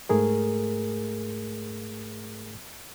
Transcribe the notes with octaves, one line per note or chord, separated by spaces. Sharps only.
G#2 A3 G#4 A#4